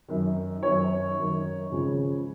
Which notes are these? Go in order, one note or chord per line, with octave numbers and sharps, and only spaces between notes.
F#2 D#3
D#3 C#5
F#2
F#2 D#3
C#2 C#3 F3